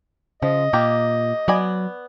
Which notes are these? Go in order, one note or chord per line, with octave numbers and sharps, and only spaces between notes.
C#3 F3 D#5
A#2 A#3 G4
F#3 B3 D5 G#5